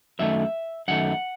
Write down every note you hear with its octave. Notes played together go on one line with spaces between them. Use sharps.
F#2 D#3 A3 E5
F#2 D#3 A3 F#5